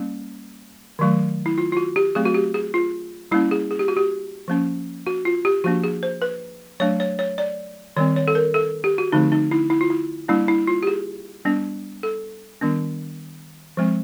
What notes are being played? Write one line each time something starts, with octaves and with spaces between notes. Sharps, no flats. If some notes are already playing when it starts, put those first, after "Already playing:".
Already playing: G3 A#3 C#4
D#3 F#3 A3
E4
F4
F4
F#4
G4
F#3 A3 C4 G#4
F#4
G4
G#4
F4
G3 A#3 C#4 E4
G#4
G#4
G4
F#4
G4
F3 A#3 C#4
F#4
F4
G4
F3 A#3 D4 F#4
G#4
C5
B4
F#3 A3 D4 C#5
C#5
C#5
D5
D#3 G3 C4 C#5
C#5
A4
A#4
A4
G4
F#4
D3 F3 A3 C4 D#4
D#4
E4
E4
F4
E4
G3 A#3 D4 E4
E4
F4
G4
G#4
G3 B3 D4
A4
D#3 G3 B3 D4
F3 G#3 C4